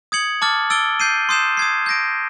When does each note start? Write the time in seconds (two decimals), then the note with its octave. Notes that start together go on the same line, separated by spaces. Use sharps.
0.12 D#6 G#6 C#7 F#7
0.42 A5 D6 F6 A6
0.70 E6 A6 D7 G7
1.00 G6 C7 D#7
1.29 C6 D#6 G6 C7 E7
1.57 D#6 G#6 C7
1.86 G6 A#6 D7